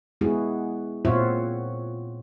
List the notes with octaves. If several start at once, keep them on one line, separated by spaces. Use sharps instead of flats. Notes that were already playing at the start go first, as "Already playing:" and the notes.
G#3 B3 E4 F#4 G#4
A#2 C4 F4 F#4 C#5 E5